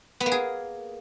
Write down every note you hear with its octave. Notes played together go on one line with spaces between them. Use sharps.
B3
A#3
G#4